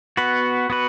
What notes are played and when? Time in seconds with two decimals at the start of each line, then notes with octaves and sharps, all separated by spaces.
0.17 B3 F#4 B4
0.70 B3 F#4 B4